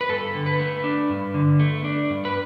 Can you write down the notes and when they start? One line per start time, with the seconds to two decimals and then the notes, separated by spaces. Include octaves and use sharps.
0.01 B4
0.09 G2 A4
0.34 D3
0.46 B4
0.59 A3
0.84 D4
1.10 G2
1.34 D3
1.59 A3
1.84 D4
2.10 G2
2.25 B4